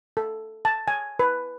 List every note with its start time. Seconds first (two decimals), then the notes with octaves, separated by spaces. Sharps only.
0.17 A4
0.65 A5
0.88 G#5
1.19 B4